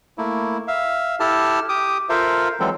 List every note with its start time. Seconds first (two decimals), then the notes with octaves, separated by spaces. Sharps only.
0.18 A3 A#3 E4
0.68 E5 F5
1.20 E4 G4 A4 A5 F6
1.69 G4 D6 D#6
2.09 F4 A4 A#4 C5 E5 F5
2.60 E3 F#3 G#3 C4 A4